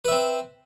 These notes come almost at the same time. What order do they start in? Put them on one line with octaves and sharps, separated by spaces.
B4 E5 C4